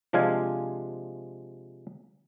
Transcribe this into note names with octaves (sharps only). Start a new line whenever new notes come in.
C3 F3 G#3 D4 F5 G#5